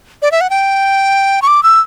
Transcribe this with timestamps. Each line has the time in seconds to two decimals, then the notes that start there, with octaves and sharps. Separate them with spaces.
0.22 D5
0.32 E5
0.41 F#5
0.50 G5
1.42 C#6
1.47 D6
1.63 E6